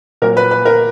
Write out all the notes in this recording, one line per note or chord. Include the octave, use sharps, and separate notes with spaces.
A#2 F#3 A#4
B4
B4
A#4